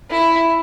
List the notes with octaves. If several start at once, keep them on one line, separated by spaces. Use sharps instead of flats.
E4